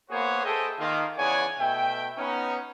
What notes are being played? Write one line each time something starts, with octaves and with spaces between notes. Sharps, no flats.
A#3 B3 F#4 G#4 C5 C#5
G#4 A4 C5 D#5 E5 G5
D#3 A#3 F4
E2 C#3 C#5 D5 F#5 G#5
B2 A3 E5 G5
B3 C#4 D#4